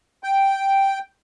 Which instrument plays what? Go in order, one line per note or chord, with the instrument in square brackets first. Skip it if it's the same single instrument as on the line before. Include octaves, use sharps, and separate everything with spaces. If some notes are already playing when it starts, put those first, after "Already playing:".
[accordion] G5